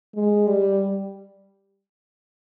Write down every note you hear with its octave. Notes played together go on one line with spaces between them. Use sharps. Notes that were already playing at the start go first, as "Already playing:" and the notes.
G#3
G3